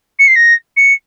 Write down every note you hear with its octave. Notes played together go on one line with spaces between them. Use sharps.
C#7
C7
A#6
C#7